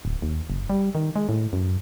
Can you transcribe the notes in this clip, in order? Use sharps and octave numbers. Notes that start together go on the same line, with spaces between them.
D1
D#2
F#1
G3
D#3
G#3
A2
F#2